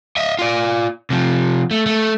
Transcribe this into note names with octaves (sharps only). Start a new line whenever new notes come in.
D#5 E5
F4 D5
C3 F3
A3
A3